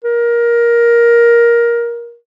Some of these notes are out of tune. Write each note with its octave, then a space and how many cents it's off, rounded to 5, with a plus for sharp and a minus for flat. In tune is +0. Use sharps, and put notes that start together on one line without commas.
A#4 +15